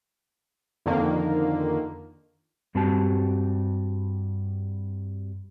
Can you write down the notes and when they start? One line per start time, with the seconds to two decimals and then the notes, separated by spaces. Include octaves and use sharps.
0.86 F2 D3 D#3 A#3
2.75 G2 G3 C4 F#4 G4 A5